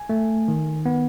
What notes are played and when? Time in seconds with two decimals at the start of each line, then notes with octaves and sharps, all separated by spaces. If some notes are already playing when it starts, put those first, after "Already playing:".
Already playing: G#5
0.09 A3
0.48 D#3
0.86 B3